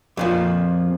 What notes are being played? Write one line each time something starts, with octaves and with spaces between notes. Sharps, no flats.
F2 A#2 F3